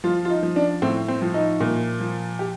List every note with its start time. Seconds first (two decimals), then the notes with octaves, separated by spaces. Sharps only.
0.04 F3 F4
0.25 F4
0.30 D#4
0.43 F3
0.56 D4
0.82 A2 C4
1.08 C4
1.21 F3
1.34 D#4
1.60 A#2
2.00 F3
2.39 G4